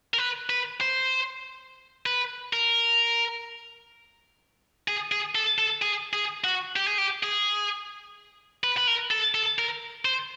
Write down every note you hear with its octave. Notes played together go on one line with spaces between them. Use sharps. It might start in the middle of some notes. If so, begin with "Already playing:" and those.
A#4
B4
B4
C5
B4
A#4
G#4
G#4
A4
A4
G#4
G#4
F#4
G4
G#4
G4
G#4
B4
B4
A#4
A4
A4
A#4
C5